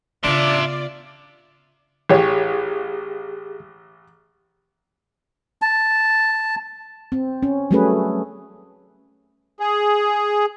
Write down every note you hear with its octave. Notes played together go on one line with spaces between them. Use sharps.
C#3 B3 D4 F4 D5 E5 C6
A1 G4 G#4 C#5
A5
C4
C#4
F#3 G3 A3 C#4 G#4 B4
G#4